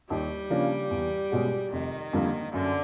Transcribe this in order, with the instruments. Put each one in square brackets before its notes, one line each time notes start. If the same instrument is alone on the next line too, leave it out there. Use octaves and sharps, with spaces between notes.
[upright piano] D#2 [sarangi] G3
[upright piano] C#3 F3 A#3 D4
E2
B2 G#3 C#4 F#4
[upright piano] F1 [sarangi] D#3
[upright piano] F2 D3 G3 A#3
[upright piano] F#2 [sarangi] D3